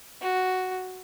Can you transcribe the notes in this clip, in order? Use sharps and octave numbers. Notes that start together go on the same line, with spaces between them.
F#4